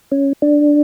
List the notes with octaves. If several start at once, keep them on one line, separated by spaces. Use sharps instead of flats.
C#4
D4